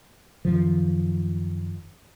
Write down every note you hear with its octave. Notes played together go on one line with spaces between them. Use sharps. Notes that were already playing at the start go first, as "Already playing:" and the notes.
F#2 D#3 F3